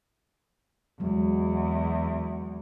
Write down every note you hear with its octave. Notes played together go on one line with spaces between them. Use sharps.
E2 F#3 G#3